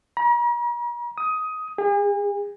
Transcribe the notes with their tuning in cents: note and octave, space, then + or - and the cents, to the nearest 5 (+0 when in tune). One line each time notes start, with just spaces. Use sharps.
A#5 +45
D#6 +15
G#4 -40